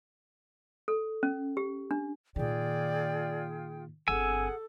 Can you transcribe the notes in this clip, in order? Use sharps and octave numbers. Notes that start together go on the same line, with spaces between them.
A4
C#4
G4
D4
A#2 D#3 F4 G#4 D5 G5
G1 C4 G#4 A4 F#5 G#5 E6